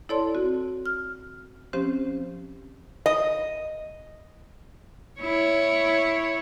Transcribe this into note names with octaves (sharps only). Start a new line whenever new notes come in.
E4 A4 C#5 D5 A5 C6
C4 F#4
F6
F3 C4 C#4 G4 C5
D#5
E4 C#5